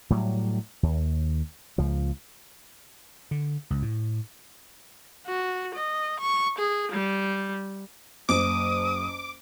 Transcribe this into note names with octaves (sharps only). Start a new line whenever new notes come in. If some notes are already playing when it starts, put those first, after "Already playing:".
A2 F#3 G3
D#2
C#2 F3
D3
C#2
A2
F#4
D#5
C#6
G#4
G3
F#1 D6 D#6